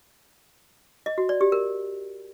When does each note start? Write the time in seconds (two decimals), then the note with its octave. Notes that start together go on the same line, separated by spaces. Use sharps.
1.06 D#5
1.18 F#4
1.29 D5
1.41 G4
1.52 A#4